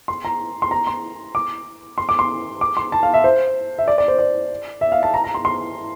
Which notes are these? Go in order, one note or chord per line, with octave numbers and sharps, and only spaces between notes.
C6
A#5
C6
A#5
C6
D6
C6
D6
C6
D6
C6
A5
F5
E5
C5
E5
D5
D5
C5
D5
E5
F5
A5
A#5
A#5
C6
C6